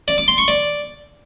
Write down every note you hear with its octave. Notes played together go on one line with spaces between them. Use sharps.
D5
D6
C6
C#6
D5